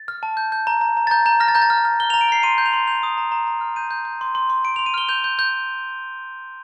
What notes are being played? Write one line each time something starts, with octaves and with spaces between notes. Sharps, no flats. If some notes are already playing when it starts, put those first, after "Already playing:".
Already playing: A6
F6
A5
G6
G6
A#5
A#5
A#5
A6
A#5 G6
A#5 G6
F6 A#6
A6
A#5 G6
A6
F6
F6
F6 G7
A#5 F7
D7
F6 C7
C6 D#7
G6
F7
C6
G6 F7
D#6
A#5
A#5
A#5
F6
G6 D#7
G6
G6
C6
C6
C6
C6 D7
C6 F7
D#7
F6 G7
G6 F7
G6
G6